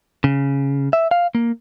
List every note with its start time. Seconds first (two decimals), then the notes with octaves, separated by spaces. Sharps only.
0.24 C#3
0.93 E5
1.11 F5
1.35 A#3